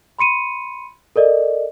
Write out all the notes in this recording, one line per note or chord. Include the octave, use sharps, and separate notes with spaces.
B5 C6 C#7 D#7
A4 A#4 D5 D#5